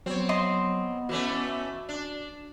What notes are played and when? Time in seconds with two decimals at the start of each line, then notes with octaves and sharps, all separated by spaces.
0.06 F#3 B3 C4 C#5
0.29 D#5 C6
1.09 E3 A3 C#4 F#4
1.89 D4